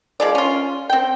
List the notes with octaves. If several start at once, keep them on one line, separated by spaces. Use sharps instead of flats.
F3 G#3 D5
C#4 F4
C4 G5